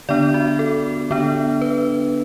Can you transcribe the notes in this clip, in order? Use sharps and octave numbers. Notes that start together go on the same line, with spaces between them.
D3 B3 D4 D5
F#4
A4
D3 B3 D4
B4